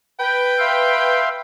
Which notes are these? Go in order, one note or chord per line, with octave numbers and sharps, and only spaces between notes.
B4 G5
E5 F5 C6